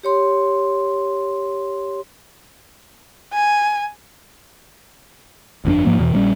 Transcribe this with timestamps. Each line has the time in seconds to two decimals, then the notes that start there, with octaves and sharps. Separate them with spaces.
0.03 G4 C#5 C6
3.33 G#5
5.65 G1 F2 C#4 D4
5.86 G#2 F3 A#3
5.99 E2 B2 E3
6.13 A#1 G3 C#4